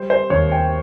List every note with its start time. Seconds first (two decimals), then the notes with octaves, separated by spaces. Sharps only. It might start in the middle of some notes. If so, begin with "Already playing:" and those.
Already playing: G3 C5
0.10 C5
0.30 D#2 C#5
0.52 G5